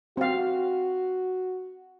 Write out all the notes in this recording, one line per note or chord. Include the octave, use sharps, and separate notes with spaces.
C4 F#4 F5